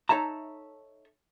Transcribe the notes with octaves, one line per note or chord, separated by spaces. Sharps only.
D#4 A4 C#5 E5 A5 A#5